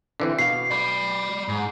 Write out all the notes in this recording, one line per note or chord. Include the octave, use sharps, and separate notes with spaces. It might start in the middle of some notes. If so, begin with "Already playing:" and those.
D3 E3 C4
B2 F5 C7
D5 B5
G#2